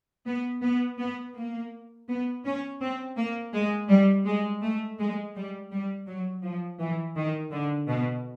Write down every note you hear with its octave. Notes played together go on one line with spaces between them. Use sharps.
B3
B3
B3
A#3
B3
C#4
C4
A#3
G#3
G3
G#3
A3
G#3
G3
G3
F#3
F3
E3
D#3
D3
B2